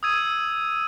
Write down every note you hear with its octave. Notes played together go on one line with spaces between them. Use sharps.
D#6 E6 G#6 D#7